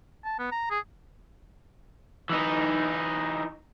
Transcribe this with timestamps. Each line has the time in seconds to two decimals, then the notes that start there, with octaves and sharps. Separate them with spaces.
0.25 A5
0.39 B3
0.52 A#5
0.71 G#4
2.30 E3 D#4